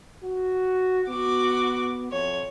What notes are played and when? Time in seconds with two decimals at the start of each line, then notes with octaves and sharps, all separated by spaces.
0.24 F#4
1.09 B3 F#4 D6
2.12 F2 C#5